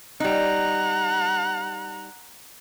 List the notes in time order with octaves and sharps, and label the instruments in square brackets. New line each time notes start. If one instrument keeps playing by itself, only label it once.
[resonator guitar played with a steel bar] G3 D#4 [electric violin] F#5 A#5